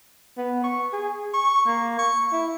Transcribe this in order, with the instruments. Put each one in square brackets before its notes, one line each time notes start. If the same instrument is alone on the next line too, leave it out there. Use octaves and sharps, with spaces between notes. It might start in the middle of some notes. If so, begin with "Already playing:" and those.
[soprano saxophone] B3
C#6
G#4
C#6
A#3
C#6
E4